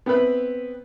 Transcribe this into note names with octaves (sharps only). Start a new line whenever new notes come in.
B3 C4 E4 B4 F#6